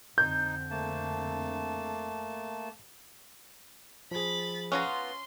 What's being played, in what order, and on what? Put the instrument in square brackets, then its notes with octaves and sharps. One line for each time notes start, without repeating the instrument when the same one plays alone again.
[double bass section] F2 D3 C4 [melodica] D#4 [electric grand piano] G6
[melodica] A3 A#3 A5
[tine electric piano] F3 G#4 [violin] B5 A6
[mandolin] B3 F4 A#5 [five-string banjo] C#4 [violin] C6